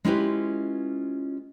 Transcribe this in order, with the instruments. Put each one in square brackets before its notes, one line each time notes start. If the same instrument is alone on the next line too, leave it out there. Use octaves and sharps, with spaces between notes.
[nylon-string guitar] G#3 C#4 E4 F4 G4 B4